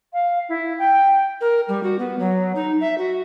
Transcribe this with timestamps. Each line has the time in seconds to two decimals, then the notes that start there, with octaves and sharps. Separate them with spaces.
0.13 F5
0.49 E4
0.79 G5
1.41 A#4
1.68 G3
1.83 F#4
1.99 B3
2.19 F#3
2.55 D#4
2.81 E5
2.98 F#4